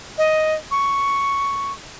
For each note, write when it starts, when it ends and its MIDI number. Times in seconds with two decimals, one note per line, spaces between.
0.18 0.55 75
0.71 1.72 85